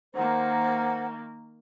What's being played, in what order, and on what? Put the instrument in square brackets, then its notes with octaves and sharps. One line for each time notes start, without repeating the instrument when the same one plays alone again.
[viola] D#3 A#3 [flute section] C5 F#5